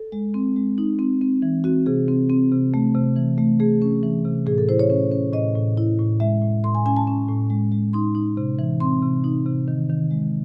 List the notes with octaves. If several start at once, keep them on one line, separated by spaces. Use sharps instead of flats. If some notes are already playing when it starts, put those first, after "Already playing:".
Already playing: A4
G#3
C4
G#3
D#4
C4
C4
E3
C4 F#4
C3 G#4
C4
C4
C3
A3
C3
E3
A3
A3 G#4
C#4
E3
C3
A2 G#4
A4
E4 C5
C#5
C#4
C#4
A2 D#5
A2
E4
A2
G#3 E5
A2
A2 C6
G#5
C#4 G#5
A5
C#4
A2
G#3
G#3
D#4 C6
D#4
C3
E3
C4 C6
C3
D#4
C3
D#3
D#3
G#3